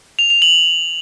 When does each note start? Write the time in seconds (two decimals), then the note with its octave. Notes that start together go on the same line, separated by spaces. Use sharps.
0.19 F7
0.30 F7
0.42 F#7